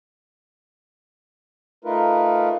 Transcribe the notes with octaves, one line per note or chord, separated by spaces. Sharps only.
A3 D#4 F4 A#4 B4